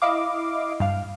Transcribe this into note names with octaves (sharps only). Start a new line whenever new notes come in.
E4 D#5 F5 D6
G2 F5